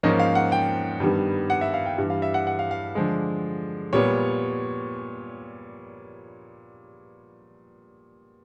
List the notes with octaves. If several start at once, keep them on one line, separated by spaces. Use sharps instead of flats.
G#2 F3 A#3 C#4 D#5
F5
F#5
G5
G2 D#3 G3 B3
F#5
E5
F5
G5
G2 E3 G3
F5
E5
F#5
F#5
F5
F5
D3 F3 G#3
A#2 G3 B3 C#5